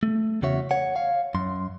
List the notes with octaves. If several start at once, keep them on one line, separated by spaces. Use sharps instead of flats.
A3
E2 C#3 F#4 C#5 E5
C#5 F#5
C#5 F5
F#2 C6